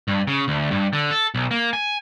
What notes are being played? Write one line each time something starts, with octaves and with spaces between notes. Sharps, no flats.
G2
C#3
D2
G2
D3
A4
B1
A#3
G#5